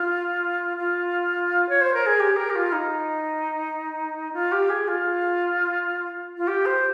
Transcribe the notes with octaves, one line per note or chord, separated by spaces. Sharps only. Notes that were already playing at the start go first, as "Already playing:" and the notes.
Already playing: F4
F4
C#5
C5
A#4
G#4
G4
A#4
G4
F4
D#4
F4
G4
G#4
F4
F4
G4
C5